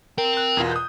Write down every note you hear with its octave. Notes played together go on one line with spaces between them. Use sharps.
C4 A#4 G5
F#6
E2 B2 F4
D#6 G6